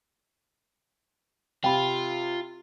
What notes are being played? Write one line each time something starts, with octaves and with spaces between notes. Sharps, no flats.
C3 F4 G5 B5